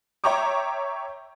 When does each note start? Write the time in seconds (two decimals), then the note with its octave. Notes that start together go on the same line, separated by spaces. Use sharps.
0.24 C#5 E5 G5 A#5 C#6 D6